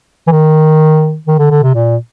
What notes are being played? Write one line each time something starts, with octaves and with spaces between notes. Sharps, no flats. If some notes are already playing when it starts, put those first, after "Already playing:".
E3
D#3
D#3
D3
D3
C3
A#2